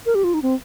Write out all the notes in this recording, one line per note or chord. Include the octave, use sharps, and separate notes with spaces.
A#4
G4
F4
D#4
C4